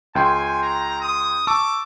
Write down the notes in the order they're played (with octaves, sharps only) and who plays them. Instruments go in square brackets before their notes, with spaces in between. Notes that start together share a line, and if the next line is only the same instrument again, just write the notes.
[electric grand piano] C#2 G5 C6 [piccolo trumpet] G#5
[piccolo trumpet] A#5
D#6
[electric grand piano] A5 C#6 E6 [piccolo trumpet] D6